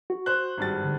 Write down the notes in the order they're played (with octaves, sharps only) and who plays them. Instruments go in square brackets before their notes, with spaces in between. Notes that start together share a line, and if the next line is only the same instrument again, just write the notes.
[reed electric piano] F#4
[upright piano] C5 F#6
G#1 G2 A6
[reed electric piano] D3